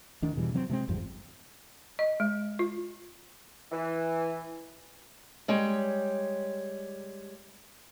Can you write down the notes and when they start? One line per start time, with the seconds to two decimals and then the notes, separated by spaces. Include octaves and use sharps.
0.22 D2 D#3 D4
0.35 E2 B2 E3 G3
0.53 C3 F#3 A#3 C4
0.69 C3 G#3 A#3 C4
0.88 G#1 E2 G2 F3
1.99 D#5
2.20 G#3
2.59 F4
3.72 E3
5.48 G3 G#3 C#5 G5